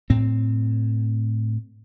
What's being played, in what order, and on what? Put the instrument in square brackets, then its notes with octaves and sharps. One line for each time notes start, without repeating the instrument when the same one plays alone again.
[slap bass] A2 C4